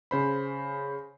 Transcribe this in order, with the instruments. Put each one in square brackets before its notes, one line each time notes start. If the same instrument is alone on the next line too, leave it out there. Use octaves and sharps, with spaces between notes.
[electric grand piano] C#3 C5 B5